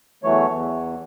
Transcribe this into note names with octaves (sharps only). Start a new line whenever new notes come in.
E2 E3 F#3 A3 C#5
E2